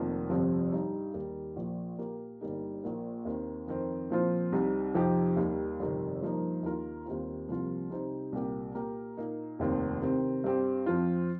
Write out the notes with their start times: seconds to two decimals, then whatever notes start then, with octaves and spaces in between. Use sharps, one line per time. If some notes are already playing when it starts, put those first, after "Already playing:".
Already playing: F1 F2 D#3 A#3 F4
0.30 G1 F2 C3 F3
0.72 G2 G3 D#4
1.14 D#2 D#3 G3
1.56 A#1 A#2 F3
1.98 A#2 A#3 G4 A#4
2.41 G1 G2 G3 A#3 D#4
2.84 A#1 A#2 A#3
3.25 D#2 D#3 C4
3.68 F2 D#3 C4
4.10 A#2 F3 C4 F4 C5
4.52 C2 C3 G3 D#4
4.94 F2 C3 F3 D#4 G4
5.37 D#2 D#3 G3
5.79 G1 F2 C3 D#3
6.22 G2 F3 A#3 D#4
6.63 D#2 D#3 A#3 F4 A#4
7.06 D#2 D#3 G3 C4 F4
7.48 C2 C3 F3 A#3 F4
7.90 C3 G3 D#4 C5
8.32 C2 A#2 A#3 G4
8.75 A#2 A#3 G4 A#4
9.17 A#2 A#3 D#4
9.59 F1 D#2 D#3 C4
10.02 C3 D#3 C4
10.44 G2 G3 C4 G4
10.86 F2 F3 C4 F4